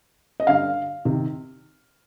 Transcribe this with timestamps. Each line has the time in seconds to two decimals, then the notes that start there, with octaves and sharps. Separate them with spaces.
0.40 D#5
0.47 G2 D3 F5
1.05 C3 D#3